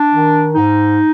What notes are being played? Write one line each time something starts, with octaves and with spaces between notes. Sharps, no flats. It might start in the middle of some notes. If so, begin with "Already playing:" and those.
Already playing: D4
D#3
G#2 D#4